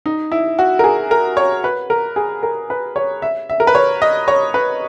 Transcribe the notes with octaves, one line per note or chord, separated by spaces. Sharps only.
D#4
E4
F#4
A#4
G#4
A#4
C#5
B4
A#4
G#4
A#4
B4
C#5
E5
E5
A#4
B4
C#5
D#5
C#5
B4